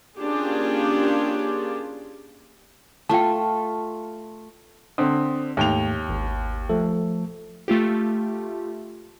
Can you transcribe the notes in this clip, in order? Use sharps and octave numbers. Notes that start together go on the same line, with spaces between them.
A#3 C#4 D4 F4 G4 G#4
A3 F4 G5 A5
D3 C4 D#6
D#2 G#2 A3 G5 F7
G#1
F3 A3 A4
A3 F4 G4